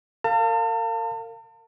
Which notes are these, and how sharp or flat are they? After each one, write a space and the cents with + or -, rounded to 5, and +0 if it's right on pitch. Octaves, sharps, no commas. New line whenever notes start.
A#4 -40 F5 +0 A5 +40